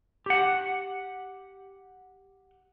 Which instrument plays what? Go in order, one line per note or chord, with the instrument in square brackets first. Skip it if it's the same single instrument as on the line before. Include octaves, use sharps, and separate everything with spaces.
[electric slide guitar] G4 F#5